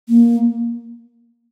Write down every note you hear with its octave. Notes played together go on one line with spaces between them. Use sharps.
A#3